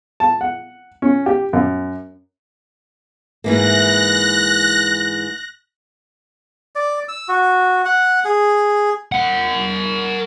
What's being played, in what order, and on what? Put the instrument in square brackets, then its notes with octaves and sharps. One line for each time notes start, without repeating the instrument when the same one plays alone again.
[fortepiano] A5
F#5
C#4
G4
F#2
[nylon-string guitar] G#2 E3 A#3 [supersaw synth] F#6 A#6
[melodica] D5
E6
F#4
F#5
G#4
[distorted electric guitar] A#4 F#5